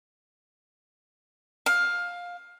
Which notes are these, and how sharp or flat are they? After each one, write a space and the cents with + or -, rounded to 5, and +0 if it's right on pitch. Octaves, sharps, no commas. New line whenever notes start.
F5 +15